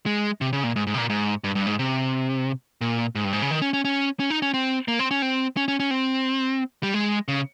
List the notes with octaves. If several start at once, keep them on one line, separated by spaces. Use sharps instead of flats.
G#3
C3
C#3
A#2
G#2
G#2
C3
A#2
G#2
G2
G2
G#2
C3
A#2
G#2
G2
G#2
C#3
D#3
C#4
C#4
C#4
C#4
D#4
C#4
C4
A#3
C4
C#4
C4
C#4
C#4
C#4
C4
G3
G#3
C#3